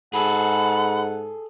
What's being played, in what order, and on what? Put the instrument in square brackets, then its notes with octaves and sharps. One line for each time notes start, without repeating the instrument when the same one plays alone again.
[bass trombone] G#2 [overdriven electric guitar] G#4 A4 [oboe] F#5 [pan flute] B5